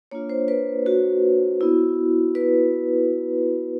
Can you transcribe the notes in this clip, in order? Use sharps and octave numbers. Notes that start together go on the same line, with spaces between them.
A#3 D4 F4 C#5
C5
B4
F#4
B3 E4
B4